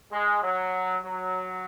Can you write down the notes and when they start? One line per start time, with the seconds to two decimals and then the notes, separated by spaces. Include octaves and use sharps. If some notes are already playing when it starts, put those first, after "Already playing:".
0.13 G#3
0.42 F#3
1.04 F#3